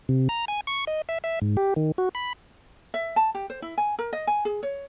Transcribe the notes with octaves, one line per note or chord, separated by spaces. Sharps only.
C3
A#5
G#5
C#6
D#5
E5
E5
G#2
G4
D#3
F#4
B5
E5
A5
G4
C5
E4
G#5
A#4
D#5
G#5
G#4
C#5